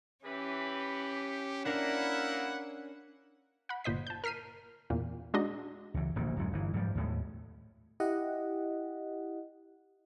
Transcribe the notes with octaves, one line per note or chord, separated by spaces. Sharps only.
E3 C#4 G4 B4
A#3 D4 E4 A#4 F#5
F#5 B5
G1 A#2 C5 D#5 B6
A5 G6
A#4 F6 B6 C7 D#7
E2 A#2
G#3 D4 D#4 F#4 D#5
C#2 E3
D1 A#1 D#2 A#3
D1 F#2 G#3
G1 E3
G#2 F3 G3
D#2 A2 G#3
E4 G4 D#5 F#5